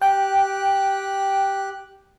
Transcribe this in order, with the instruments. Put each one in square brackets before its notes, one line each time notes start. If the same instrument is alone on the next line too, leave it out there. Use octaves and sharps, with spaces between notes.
[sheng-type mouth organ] G4 F#6 [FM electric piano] G5